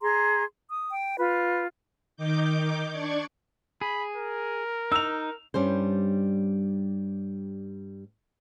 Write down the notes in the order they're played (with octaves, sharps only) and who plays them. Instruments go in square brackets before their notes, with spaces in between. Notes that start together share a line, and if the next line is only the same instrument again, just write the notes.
[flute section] G#4 A#5 C6
D#6
G5
F4 B4
[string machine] D#3 D#4 D6 G6
D4 D5 C#6 G#6
[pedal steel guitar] G#4 [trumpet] B5
[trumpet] A#4
[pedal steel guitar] D#4 [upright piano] E6 F7
[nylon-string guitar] G2 G3 C#4 C5